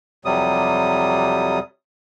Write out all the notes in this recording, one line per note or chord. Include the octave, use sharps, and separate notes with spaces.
F2 C3 F#3 G3 D#6